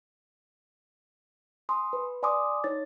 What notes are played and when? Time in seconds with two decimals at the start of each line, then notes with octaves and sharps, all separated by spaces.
1.69 G#5 C6 D#6
1.93 B4
2.23 D5 G#5 C6 D6 D#6
2.64 D#4 C#5 A6